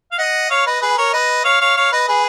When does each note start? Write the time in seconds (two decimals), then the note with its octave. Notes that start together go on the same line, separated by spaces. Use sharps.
0.12 F5
0.18 D#5 F#5
0.50 C#5 F5
0.66 B4 D#5
0.81 G#4 B4
0.97 A#4 C#5
1.13 B4 D#5
1.45 C#5 F5
1.61 C#5 F5
1.77 C#5 F5
1.92 B4 D#5
2.08 G#4 B4